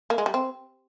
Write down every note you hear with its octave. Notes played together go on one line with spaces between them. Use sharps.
A#3
G#3
G3
C4